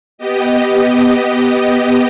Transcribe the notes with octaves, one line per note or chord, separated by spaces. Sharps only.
B3 G4 D#5